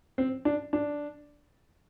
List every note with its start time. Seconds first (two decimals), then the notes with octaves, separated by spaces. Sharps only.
0.18 C4
0.45 D4
0.73 D4